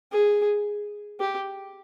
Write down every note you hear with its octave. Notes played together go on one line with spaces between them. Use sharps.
G#4
G4